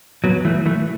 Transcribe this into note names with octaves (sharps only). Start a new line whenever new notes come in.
F#3 B3
E3 A3
E3 A3